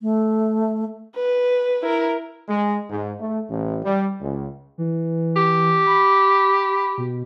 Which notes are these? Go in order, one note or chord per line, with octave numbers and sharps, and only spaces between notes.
A3
B4
E4 A#4
G#3
G#2
A3
A1
G3
C#2
E3
G4
B5
B2